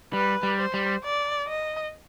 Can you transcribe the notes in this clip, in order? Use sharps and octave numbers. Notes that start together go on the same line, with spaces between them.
G3 B4
G3
C5
G3
D5
D#5